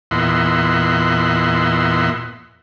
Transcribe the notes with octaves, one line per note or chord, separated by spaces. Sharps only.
E2 A#2 D#5 E5 F#5 C6